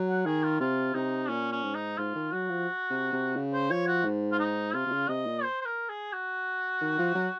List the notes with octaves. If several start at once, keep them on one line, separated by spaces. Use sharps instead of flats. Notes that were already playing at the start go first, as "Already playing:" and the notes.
Already playing: F#3
F#5
D#3 G#4
F4
C3 F4
C3 D#4
A#2 C#4
C#4
G#2
D#4
G#2 F4
D#3
F#3 F#4
F3
C3
C3
C#3
C5
F3 C#5
F#4
G#2
F4
D#4
C3 F4
C3
C#3
C3 D#5
A#2
C5
C5
A#4
G#4
F#4
D#3
F3
F#3